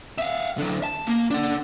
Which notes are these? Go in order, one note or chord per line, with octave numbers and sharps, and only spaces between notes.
E5 F5
D3 F#3
A5
A#3
D4 F#5